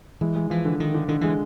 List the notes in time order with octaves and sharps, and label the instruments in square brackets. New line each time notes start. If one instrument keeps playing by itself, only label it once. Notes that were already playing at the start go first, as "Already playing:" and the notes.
[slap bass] E3 [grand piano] G#3
[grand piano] G#3
[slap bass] E3 [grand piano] F3
[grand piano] D3
[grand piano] D3 [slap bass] D#3
[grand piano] D3
[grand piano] D3 [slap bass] D#3
[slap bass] E3 [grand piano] G#3